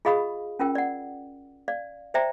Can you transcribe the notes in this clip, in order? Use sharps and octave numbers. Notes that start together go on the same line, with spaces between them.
F4 G#4 D#5 F5 B5 D#6
C#4 F4 A#4 G5
D5 F#5
D5 F5
C5 D5 E5 G5 A#5